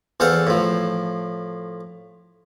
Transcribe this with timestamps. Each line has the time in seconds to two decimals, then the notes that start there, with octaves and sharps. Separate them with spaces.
0.20 E2 A4 C5 F5 F#5
0.47 A2 F3